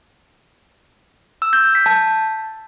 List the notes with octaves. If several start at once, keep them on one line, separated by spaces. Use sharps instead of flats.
E6
G6
G6
B6
A5